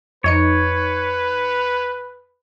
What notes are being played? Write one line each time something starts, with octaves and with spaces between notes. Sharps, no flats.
F2 D#4 B4 C#5 C#7